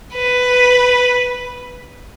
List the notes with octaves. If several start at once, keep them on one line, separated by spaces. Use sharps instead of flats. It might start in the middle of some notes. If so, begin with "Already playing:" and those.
B4